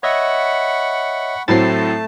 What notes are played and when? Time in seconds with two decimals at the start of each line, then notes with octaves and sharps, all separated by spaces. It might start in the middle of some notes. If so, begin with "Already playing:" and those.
0.03 C#5 D#5 E5 F#5 B5 C#6
1.48 A2 F#3 A3 C4 A5 A6 C7